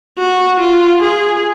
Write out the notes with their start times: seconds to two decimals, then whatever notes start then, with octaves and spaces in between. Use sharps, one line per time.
0.18 F#4
0.60 F4
1.02 G#4